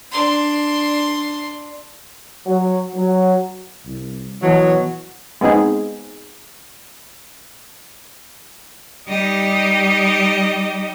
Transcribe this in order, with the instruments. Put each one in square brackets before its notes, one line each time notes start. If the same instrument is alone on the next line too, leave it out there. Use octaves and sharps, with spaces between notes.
[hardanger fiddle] D4 C6
[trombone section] F#3
F#3
[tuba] C2
[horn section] B2 F#3 [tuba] E3
[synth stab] G#3 B3 C4 D#4 G#4
[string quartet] G3 D#4 G4 D#5